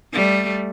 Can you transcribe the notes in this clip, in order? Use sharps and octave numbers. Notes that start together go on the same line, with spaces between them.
G3 A3